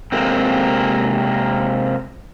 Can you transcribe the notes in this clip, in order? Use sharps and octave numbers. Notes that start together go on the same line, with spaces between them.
C3 G#3 A#3 C4